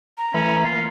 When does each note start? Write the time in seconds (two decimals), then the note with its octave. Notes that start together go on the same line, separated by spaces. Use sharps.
0.18 A#5
0.34 E3 A3 C#4 B5
0.64 A#3 F4